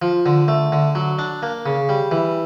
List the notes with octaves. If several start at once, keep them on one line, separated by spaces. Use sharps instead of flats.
F3
D3
A3
D3
F#3
D4
A#3
C#3
G3
E3